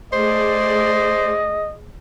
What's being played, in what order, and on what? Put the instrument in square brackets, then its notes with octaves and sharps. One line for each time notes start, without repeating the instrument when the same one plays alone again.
[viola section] A3 G#4 D5 [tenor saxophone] C5 [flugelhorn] D#5